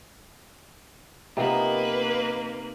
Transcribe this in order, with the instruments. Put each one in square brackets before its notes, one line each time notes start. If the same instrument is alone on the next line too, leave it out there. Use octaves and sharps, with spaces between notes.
[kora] C3 F3 B3 [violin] A#3 B4 [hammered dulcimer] D#4 A#4